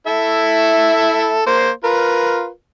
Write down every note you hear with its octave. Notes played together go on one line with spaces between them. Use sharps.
E4 A4 E5
A#3 C5
F4 A#4 B4